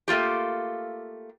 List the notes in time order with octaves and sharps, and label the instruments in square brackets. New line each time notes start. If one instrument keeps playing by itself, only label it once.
[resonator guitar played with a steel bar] A3 A#3 F4 G4